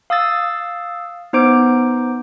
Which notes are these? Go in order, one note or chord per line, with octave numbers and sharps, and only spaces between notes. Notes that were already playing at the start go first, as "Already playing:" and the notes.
F5 D#6 E6 A6
B3 D#4 C5 D6 D7